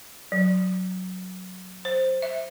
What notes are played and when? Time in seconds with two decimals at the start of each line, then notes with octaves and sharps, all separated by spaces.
0.32 F#3
1.85 C5
2.22 E5